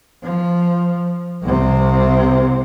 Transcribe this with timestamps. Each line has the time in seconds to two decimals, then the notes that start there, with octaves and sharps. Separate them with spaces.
0.23 F3
1.42 C2 C3